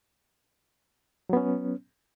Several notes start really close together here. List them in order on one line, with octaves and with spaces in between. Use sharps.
F#3 B3 C#4